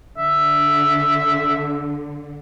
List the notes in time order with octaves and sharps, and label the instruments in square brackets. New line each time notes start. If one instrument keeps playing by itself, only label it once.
[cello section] D3 [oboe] E5